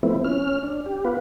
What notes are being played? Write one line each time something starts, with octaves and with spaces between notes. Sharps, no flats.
F3 A3 B3 C4 E4
C#4 F6
D4
G4
B3 F4 B4